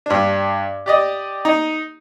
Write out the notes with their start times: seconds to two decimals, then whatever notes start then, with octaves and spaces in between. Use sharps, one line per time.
0.06 G2 D4
0.86 G4 D5 D#5
1.45 D#4